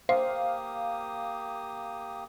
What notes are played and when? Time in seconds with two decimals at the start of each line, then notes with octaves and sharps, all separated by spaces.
0.09 A#3 G4 C5 F5 D#6